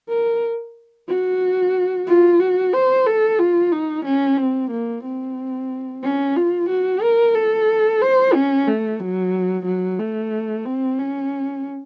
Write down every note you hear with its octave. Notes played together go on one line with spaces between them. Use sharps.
A#4
F#4
F4
F#4
C5
A4
F4
D#4
C#4
C4
A#3
C4
C#4
F4
F#4
A#4
A4
C5
C#4
A3
F#3
F#3
A3
C4
C#4